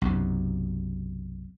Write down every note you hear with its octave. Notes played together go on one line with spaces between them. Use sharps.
B1 F#2 C3